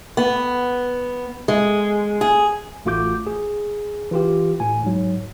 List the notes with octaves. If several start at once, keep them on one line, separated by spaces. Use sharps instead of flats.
B3
G#3
G#4
A1 A3 F4 F#4 D6 G6
G#4
E3 F4 G4
A2 G#5
G#2 F#3